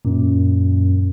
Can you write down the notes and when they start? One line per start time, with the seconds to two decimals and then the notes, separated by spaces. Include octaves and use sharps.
0.05 F#2 A#2